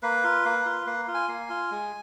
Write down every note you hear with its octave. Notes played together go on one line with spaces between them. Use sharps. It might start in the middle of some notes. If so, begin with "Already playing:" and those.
A#3 B4
F4
A#3
F4
A#3 B4
F4
G#5
A#3
F4
G#3